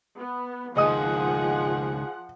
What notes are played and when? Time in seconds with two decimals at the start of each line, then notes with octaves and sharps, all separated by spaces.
0.17 B3
0.77 C#2 D#3 F3 G#4 D#5 F#5 D#6